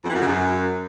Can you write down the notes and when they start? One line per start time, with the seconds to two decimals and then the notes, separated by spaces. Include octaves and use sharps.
0.04 F2
0.10 E3
0.15 F#2
0.21 C#3
0.26 F#2